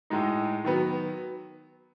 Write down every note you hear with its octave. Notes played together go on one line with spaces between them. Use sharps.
A2 G#3 D#4
D#3 F#3 B3